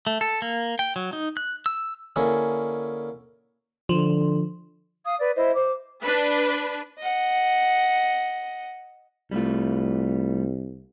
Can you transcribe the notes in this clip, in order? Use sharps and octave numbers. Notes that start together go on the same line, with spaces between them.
A3
A4
A#3
G5
F#3
D#4
F#6
E6
D3 A#3 C#4 E4 G#4 C#5
D3 F3
F5 D#6
B4 D5
E4 C5 D#5 E5
C5 D6
D4 B4
D#5 F#5
C2 G3 A3 F4